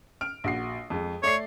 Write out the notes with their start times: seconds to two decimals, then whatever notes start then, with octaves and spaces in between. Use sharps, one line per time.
0.21 F6 D7
0.44 A#1 F#4 C7
0.90 F2 G#3
1.23 A3 C#5 D5 C7